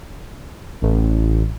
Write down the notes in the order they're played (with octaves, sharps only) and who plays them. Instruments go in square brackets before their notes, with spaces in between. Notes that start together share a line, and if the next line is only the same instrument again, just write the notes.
[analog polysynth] A1